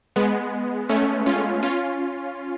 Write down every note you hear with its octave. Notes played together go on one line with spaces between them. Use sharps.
G#3 B3
A3 C#4
C#4 F4
C#4 F4